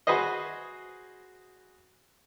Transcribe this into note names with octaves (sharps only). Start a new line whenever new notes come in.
F#4 G#4 B4 C5 D#5